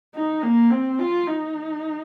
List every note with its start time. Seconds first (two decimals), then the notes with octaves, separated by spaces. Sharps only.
0.15 D#4
0.42 A#3
0.70 C4
0.99 F4
1.27 D#4